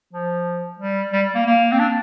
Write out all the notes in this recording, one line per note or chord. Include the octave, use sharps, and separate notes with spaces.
F3
G3
G3
A#3
A#3
C4
D4